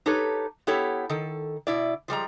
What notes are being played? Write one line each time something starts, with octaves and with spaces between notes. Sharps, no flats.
D#4 G4 A4 B4 C#5
B3 E4 G4 A4 C#5
D#3 A4
B2 E4 D5
F3 G3 G#3 A#5